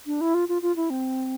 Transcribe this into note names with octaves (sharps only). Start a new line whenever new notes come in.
D4
E4
F4
F4
F4
E4
C4